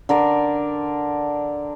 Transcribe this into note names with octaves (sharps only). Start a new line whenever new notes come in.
D3 A#4 D5